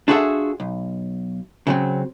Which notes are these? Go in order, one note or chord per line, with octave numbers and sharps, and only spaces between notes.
D4 F4 F#4 G#4 A4 E5
B1
C#3 F#3 C4